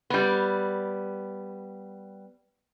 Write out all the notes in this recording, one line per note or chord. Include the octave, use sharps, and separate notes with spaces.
G3 B3